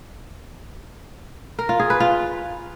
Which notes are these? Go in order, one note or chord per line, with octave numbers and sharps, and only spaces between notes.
A#4
F4
G#4
B4
F4